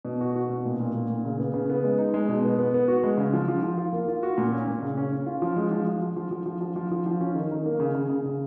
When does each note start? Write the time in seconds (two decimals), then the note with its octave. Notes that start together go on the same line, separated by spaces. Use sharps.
0.05 B2
0.21 F#4
0.36 F#4
0.49 B2
0.65 A#2
0.80 A#2
0.94 A#2
1.10 A#2
1.25 C#3
1.39 B3
1.54 C#3
1.70 B3
1.84 G#3
1.98 D#4
2.14 G#3
2.28 B2
2.44 B3
2.59 B3
2.74 B3
2.88 F#4
3.03 G#3
3.18 C#3
3.33 F3
3.48 F3
3.63 F3
3.77 F4
3.93 A#3
4.08 F4
4.23 F#4
4.38 A#2
4.53 C#4
4.67 A#2
4.83 C#3
4.97 C#4
5.12 C#4
5.26 F4
5.42 F3
5.56 G#3
5.71 F3
5.87 F3
6.02 F3
6.16 F3
6.31 F3
6.46 F3
6.61 F3
6.76 F3
6.91 F3
7.06 F3
7.21 C#4
7.35 D#3
7.51 D#3
7.66 A#3
7.80 C#3
7.95 C#3
8.10 C#3
8.26 C#3